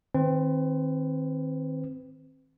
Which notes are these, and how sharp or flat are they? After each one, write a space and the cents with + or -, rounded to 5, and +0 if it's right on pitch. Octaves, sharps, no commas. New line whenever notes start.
D#3 +0 C4 +10 B4 +30